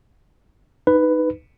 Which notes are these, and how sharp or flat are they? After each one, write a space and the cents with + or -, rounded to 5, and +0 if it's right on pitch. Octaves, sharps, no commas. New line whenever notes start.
D#4 +0 B4 +5